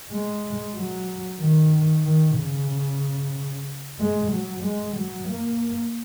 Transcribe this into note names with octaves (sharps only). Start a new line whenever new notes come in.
G#3
F#3
D#3
D#3
C#3
G#3
F#3
G#3
F#3
A#3